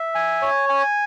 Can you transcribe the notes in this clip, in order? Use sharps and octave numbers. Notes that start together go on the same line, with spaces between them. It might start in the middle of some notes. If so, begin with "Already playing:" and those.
Already playing: E5
G#5
C#5
G#5